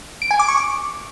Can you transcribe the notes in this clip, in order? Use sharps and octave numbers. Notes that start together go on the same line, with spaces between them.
D7
G#5
D6
C#6
D6